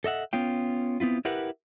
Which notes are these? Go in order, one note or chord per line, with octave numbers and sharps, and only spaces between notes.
A4 D#5 E5 F#5
B3 C#4 F4 G5
B3 C4 E4 F4
E4 G4 A#4 B4 E5 F#5